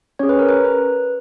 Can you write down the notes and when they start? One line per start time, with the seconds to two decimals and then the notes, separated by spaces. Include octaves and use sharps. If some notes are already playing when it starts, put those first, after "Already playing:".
0.19 C#4 G#4 C#5
0.29 B4
0.39 A#4
0.49 B4
0.65 B4